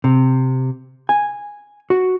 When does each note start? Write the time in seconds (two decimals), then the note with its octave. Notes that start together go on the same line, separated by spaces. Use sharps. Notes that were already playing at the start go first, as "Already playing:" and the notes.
0.04 C3
1.09 G#5
1.90 F#4